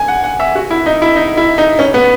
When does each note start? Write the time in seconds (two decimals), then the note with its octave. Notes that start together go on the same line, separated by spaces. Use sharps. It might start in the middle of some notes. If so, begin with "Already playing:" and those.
Already playing: G#5
0.08 F#5
0.24 F#5
0.40 E5
0.55 F#4
0.70 E4
0.86 D#4
1.02 E4
1.16 D#4
1.37 E4
1.58 D#4
1.79 C#4
1.94 B3